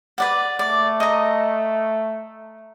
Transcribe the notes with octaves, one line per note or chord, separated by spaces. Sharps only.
B4 D5 F#5
A3 D5
D#5 A#5